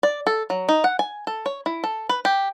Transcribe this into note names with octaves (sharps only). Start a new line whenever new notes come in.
D5
A4
F#3
D#4
F#5
G#5
A4
C#5
E4
A4
B4
G4